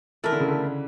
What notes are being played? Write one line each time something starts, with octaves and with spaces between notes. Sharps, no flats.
E3 A3 E4 A#4
D3
C#3
D3